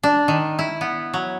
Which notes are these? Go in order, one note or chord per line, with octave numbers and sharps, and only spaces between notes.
D4
D#3
E4
B3
F#3